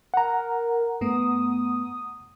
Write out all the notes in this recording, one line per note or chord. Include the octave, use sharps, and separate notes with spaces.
A#4 F#5 A#5
G2 A3 B3 D#6